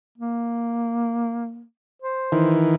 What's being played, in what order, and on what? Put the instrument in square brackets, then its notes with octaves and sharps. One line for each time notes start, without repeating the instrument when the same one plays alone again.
[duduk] A#3
C5
[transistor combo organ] D#3 E3